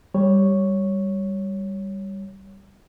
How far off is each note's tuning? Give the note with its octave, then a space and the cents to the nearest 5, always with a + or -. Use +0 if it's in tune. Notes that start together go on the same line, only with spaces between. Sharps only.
G3 +0 C#5 +0